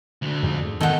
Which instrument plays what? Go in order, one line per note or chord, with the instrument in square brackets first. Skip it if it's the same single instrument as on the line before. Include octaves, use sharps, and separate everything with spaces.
[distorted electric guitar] D2 D3
[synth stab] F2 G#2
[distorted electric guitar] E2 G5 [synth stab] D#3 D#5 [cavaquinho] A4 F#5